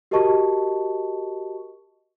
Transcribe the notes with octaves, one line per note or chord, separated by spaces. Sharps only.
F#4 G4 A#4 D#5 A5 C#6